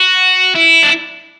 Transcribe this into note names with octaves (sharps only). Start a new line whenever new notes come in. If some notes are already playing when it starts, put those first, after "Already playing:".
Already playing: F#4
E4
D4